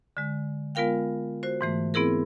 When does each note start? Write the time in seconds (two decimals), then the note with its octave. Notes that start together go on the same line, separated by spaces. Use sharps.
0.17 D3 G#3
0.75 G#3 B3 F4 A#4 F5 G5
1.43 F#4 C5
1.61 G#2 E3 A3
1.94 B3 C4 E4 G#4 A#4